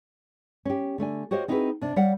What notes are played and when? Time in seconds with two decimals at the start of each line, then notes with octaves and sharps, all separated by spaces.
0.65 C#4 G4
0.98 D3 A3 D4 G#5
1.31 F#4 G4 C5 C#5 D#5 F5
1.48 C4 D#4 E4 F#4 G#4 B4
1.81 C3 D4
1.96 G3 C#5 F5 F#5